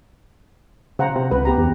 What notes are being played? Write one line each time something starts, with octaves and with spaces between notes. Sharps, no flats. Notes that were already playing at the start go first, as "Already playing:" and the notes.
C#3 C5 F#5 A#5
C3
C#2 B4
B3 G4 A#5
E2